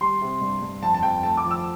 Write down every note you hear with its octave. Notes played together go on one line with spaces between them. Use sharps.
G3 C6
C3
G2
G2
F2 A5
A5
F2 G5
A3 A5
D6
F3
E6